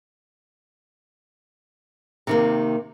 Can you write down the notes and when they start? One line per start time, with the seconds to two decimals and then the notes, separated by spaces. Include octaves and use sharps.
2.27 C3 D#3 A#3